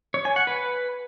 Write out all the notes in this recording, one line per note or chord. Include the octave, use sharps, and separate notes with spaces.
C#5
G#5
F#5
B4